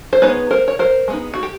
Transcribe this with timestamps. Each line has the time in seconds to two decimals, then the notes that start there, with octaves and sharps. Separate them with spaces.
0.13 C5
0.22 G#3 B3 D#4 B4 C#5
0.51 A#4 C5
0.68 C#5
0.79 A#4 C5
1.08 G#3 B3 D#4
1.34 F#4
1.43 G4